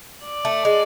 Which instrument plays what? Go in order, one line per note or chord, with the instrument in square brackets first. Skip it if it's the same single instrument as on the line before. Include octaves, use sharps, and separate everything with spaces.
[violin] D5
[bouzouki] A3
G#3